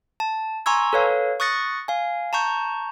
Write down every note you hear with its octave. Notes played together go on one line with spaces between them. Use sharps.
A5
G#5 A#5 C6 C#6 E6 G#6
A4 B4 C#5 F5
C#6 D#6 F#6 A6 A#6 C#7
F5 G#5
A5 A#5 C#6 G6